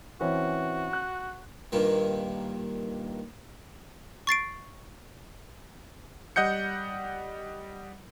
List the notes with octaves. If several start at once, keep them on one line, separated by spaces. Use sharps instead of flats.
E3 C4 C#4 F#4
F#6
G2 A#2 D#3
C#6 A6 C7 D7
G3 D#5 F#5 G6 C#7